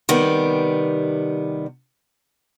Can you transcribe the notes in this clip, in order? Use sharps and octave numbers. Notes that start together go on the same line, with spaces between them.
C3 D#3 G3 B3